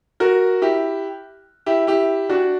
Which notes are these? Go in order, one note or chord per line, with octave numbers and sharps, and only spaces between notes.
F#4 A#4
E4 G4
E4 G4
E4 G4
D4 F#4